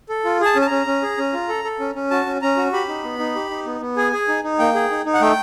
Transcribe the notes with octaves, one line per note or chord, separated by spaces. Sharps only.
A4
F4
G#4 A5
C#4
A5
C#4 A#5
C#4
G#4
C#4
F4
A4
A4
C#4
C#4
F#4 A5
C#4
C#4 A#5
F#4
G4 B5
D#4
B3
D#4
G4
D#4
B3
B3
G#4 G#5
G#4
D#4
D#4
A#3 G5
G#4
D#4
D#4
F#5
A3 G5